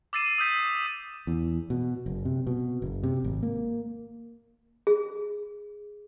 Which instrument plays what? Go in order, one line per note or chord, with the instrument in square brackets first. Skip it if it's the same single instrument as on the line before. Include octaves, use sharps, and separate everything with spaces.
[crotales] D6 E6 A6 C7 D#7 E7
D#6 E6 G6 B6
[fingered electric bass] E2
B2
F#1
C3
B2
F#1
C3
G#1
A#3
[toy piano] G#4